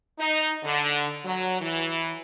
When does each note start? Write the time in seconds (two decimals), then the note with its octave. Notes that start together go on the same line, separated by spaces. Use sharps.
0.19 D#4
0.63 D3
1.24 F#3
1.61 E3